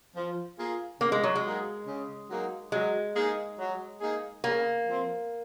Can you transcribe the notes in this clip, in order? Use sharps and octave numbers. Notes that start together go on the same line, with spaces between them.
F3
A#3 F4 G#4
C#3 A#3
G#3
F#3
G#3
F#3 A#3 D#4 G#4
C#3
F#3 A#3 D#4 G#4
F#3 G#3
A#3 D#4 G#4
F#3
A#3 D#4 G#4
C#3 A#3
F3 C4